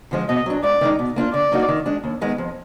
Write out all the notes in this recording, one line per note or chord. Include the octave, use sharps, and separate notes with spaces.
D3 F3 G#3
B2 D#5
F#3 D4
G#2 D5
D#3 G#3 D#4
B2
A#3 D4 F4
D3 D5
F#3 A#3 D#4 F#4
D#3
G#3 D4
D#2
D#3 G#3 B3
F2